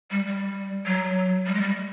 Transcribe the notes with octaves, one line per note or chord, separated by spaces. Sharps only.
G3
G3
F#3
G3
G#3
G3